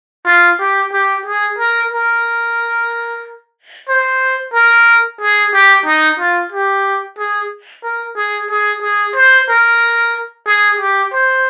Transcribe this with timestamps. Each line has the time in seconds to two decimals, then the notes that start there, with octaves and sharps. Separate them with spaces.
0.26 F4
0.59 G4
0.92 G4
1.26 G#4
1.58 A#4
1.91 A#4
3.89 C5
4.54 A#4
5.21 G#4
5.54 G4
5.86 D#4
6.19 F4
6.52 G4
7.18 G#4
7.83 A#4
8.16 G#4
8.50 G#4
8.82 G#4
9.16 C5
9.48 A#4
10.47 G#4
10.79 G4
11.12 C5